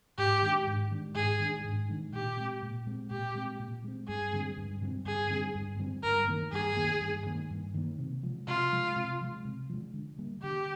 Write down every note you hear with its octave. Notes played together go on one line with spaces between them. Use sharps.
G#2 G4
D#3 G#3 D4
G#2
D#3 G#3 D4
G#2 G#4
D#3 G#3 D4
G#2
D#3 G#3 D4
A#2 G4
G#3 C4
A#2
G#3 C4
A#2 G4
G#3 C4
A#2
G#3 C4
G2 G#4
D3 G3 C4
G2
D3 G3 C4
G2 G#4
D3 G3 C4
G2
D3 G3 C4
G2 A#4
D#3 A#3
G2 G#4
D#3 A#3
G2
D#3 A#3
G2
D#3 A#3
C3
F3 G#3
C3 F4
F3 G#3
C3
F3 G#3
C3
F3 G#3
D3
G3 A#3
D3 G4